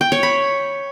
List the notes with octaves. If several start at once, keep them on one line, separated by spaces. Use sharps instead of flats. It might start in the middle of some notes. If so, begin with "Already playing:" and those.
G5
C#5
B5